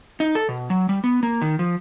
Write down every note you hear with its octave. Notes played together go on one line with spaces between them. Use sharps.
D#4
A4
B2
F#3
G3
B3
A#3
D#3
F3